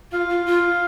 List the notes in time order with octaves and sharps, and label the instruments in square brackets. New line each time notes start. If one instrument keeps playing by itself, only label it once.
[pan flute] F4 [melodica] F5
[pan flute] F4
F4